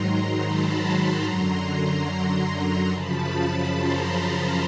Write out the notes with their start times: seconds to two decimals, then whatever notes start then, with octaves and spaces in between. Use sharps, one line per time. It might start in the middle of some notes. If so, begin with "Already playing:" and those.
Already playing: G#2 D#3 F#3 A#5 C6
0.40 A5 B5
1.23 F#2 D3 F#3 A#5 C6
2.90 F#2 C#3 F3 A5 B5
3.72 A#5 C6